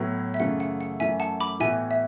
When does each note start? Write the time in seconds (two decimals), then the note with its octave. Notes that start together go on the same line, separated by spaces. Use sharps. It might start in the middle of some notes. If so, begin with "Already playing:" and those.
Already playing: A2 F#3 B3 E4
0.34 E5
0.40 F#2 C#3 E3 A3 F#5
0.60 F#5
0.81 F#5
1.00 F#2 E3 A3 E5 G#5
1.20 F#5 A5
1.40 B5 D6
1.60 A2 E3 B3 F#4 E5 G#5
1.91 E5